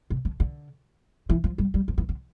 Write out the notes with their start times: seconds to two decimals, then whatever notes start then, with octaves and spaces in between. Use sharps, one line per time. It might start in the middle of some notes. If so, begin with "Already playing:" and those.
0.10 C3
0.25 D3
0.40 D3
1.30 E3
1.44 F3
1.58 G3
1.74 G3
1.88 F3
1.98 E3
2.09 D3